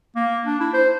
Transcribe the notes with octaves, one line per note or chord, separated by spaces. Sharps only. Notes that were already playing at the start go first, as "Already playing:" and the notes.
A#3
D4
E4
C5